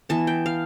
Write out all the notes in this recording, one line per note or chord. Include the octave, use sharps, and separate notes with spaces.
E3 B3 A5
G5
F5